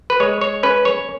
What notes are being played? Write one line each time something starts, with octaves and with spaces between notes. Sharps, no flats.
B4
G#3 C#5
C#5
C#4 B4
C#5